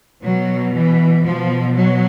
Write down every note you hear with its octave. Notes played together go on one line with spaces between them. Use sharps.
B2 F#3
E3
B2 F3
F#3